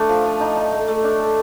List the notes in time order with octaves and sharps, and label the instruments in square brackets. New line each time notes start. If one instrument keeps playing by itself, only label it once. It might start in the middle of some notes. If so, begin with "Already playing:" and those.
Already playing: [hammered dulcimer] A3 D4
F3
F3
D#4
D#4
A3
A3
D4
A4